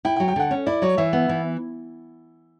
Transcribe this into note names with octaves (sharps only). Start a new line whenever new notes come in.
E4 G5
G5
F#3
G5
D3 F#5
C#4
E4 D5
F#3 C#5
E3 E5
B3
E3